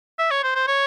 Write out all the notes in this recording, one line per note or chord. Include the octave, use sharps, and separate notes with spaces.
E5
C#5
C5
C5
C#5